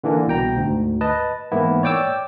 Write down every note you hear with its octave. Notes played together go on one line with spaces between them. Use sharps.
D3 E3 A#3 D4
C2 B2 G5 A#5
D2 G#2
B4 D#5 A5
G#2 E3 A#3 B3 E4
C#5 D5 G5 D6 E6